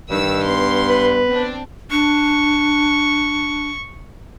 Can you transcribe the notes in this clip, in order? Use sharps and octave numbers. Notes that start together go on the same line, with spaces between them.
G2 D#3 E6
B3 C6
B4
C4 D4
D4 C#6